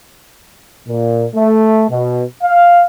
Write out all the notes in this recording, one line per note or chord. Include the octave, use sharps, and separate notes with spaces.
A#2
A3
B2
F5